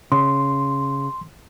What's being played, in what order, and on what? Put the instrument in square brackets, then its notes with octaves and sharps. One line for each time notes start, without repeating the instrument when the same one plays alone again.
[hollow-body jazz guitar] C#3 [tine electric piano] C6